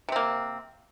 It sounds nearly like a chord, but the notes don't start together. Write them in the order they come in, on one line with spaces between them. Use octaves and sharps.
C3 C4 A#3